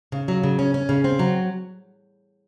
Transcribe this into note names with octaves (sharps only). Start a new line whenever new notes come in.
C#3
F#3
C#3
C#4
C#4
C#3
C4
F#3